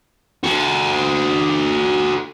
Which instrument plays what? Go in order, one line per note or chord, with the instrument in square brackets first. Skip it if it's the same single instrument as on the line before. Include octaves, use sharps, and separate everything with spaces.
[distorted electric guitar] F#4 A4